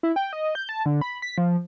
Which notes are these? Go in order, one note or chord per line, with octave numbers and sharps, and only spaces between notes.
E4
G5
D#5
G6
A5
D3
B5
B6
F3